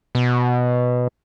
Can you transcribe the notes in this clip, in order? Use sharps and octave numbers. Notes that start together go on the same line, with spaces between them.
B2